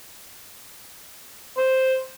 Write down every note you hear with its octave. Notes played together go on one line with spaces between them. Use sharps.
C5